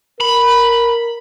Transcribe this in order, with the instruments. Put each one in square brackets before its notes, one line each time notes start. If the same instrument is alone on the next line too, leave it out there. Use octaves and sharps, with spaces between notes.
[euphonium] A#4 [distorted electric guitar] B5